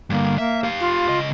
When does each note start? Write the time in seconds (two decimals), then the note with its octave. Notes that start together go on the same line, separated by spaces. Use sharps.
0.10 G2 D3 A#3
0.38 A#3 E5
0.64 G4 F5
0.80 F4
1.09 C#3 D#5